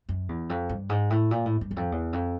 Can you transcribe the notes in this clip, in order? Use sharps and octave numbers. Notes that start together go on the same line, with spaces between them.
F#2
E2
F2
G2
G#2
A2
A#2
A2
G2
E2
F2
E2
F2